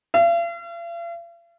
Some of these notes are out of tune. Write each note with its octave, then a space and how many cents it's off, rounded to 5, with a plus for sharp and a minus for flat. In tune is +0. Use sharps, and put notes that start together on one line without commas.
F5 -45